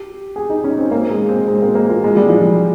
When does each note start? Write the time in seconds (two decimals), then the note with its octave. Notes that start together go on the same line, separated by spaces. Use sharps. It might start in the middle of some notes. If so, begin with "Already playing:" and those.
Already playing: G4
0.36 G#4
0.50 D#4
0.64 C#4
0.78 C4
0.91 A#3
1.11 G#3
1.29 C4
1.48 G#3
1.56 C4
1.62 A#3
1.75 A#3
1.89 F4
2.04 G#3
2.17 G3
2.29 F3
2.42 G3